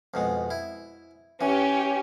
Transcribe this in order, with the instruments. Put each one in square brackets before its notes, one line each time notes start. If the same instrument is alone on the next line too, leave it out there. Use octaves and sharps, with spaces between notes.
[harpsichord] F2 B2 G#3
E4
[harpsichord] E3 [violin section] C#4 G4